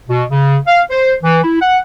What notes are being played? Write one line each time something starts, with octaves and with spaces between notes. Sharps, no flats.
B2
C#3
F5
C5
E3
E4
F#5